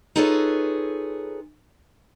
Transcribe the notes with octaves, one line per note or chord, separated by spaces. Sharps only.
D#4 F4 G#4 A4 B4 C#5